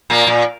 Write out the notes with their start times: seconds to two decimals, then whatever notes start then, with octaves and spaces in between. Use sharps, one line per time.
0.10 A#2 A#3
0.27 A#2